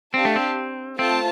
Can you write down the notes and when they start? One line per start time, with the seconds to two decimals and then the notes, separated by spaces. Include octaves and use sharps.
0.14 C4 D4 G4 F5 A5
0.25 A3
0.36 C4
0.99 A3 C4 F4 C5 A5